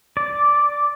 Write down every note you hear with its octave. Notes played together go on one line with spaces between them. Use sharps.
D5